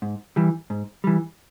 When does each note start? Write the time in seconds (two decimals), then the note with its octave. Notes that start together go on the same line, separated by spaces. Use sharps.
0.02 G#2
0.36 E3 G3
0.70 G#2
1.04 E3 G3